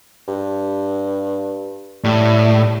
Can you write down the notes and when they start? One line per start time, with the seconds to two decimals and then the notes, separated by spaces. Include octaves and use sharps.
0.28 G2
2.04 A2 G3